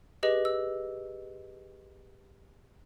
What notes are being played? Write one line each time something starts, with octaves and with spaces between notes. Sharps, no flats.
G4 G#4 B4 D#5
E6